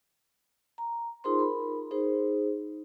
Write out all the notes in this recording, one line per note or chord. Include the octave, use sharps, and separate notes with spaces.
A#5
D#4 F4 G#4 A#4 C5 C6
A#4 B5
D#4 G#4 C5